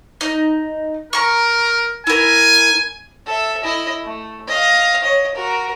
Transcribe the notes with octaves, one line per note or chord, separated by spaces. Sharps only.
D#4
A#4 A#5 C#6
E4 A#4 G#5
A4 E5
E4 D#5
A3
D#5 F5
C#5 D#5
F#4 A#4